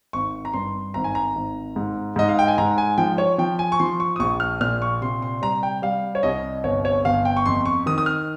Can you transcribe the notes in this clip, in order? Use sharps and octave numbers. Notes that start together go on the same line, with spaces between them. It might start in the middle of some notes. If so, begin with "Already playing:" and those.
G#1 C#6
A#5
G2 C6
G#1 A#5
G#5
A#5
G#1
G#2
G#2 D#5
F5
G5
G#5
G#2 A#5
G#5
F3 G5
C#5
F3 G5
G#5
C#6
F3 C6
C#6
D#6
A#1 C#6
F6
A#2 F6
C#6
C3 C6
C6
G3 A#5
G5
G3 F5
C#5
C2 D#5
G1 C#5
C#5
G1 F5
G5
C#6
F2 C6
C#6
D#3 D#6
D#6
F6